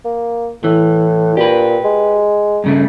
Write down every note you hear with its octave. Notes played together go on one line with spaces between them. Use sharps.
A#3
A2 E3
A#2 G4 B4
G#3
G2 C#3 A3